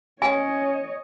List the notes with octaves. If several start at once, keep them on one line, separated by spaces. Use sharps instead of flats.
C#4 C#5 D#5 G#5